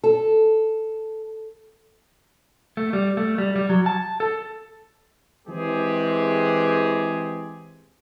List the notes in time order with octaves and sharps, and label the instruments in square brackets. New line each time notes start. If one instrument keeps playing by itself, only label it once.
[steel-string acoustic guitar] A4
[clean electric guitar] A3
G3
A3
G3
G3
F#3
A5
A4
[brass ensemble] E3 G#3 C4 G4 G#4